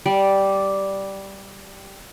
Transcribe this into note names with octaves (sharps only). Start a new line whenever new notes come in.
G3 D5